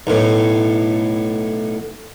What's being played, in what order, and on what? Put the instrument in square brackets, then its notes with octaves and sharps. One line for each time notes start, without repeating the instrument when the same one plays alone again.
[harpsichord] B1 A2